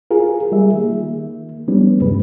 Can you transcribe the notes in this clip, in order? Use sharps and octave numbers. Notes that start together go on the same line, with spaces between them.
F4 G#4 A#4
G3 G#4 E5
D#3 A#3
D#3 F3 G3 B3 C#4 D4
D2 G2 C3 G#3 B4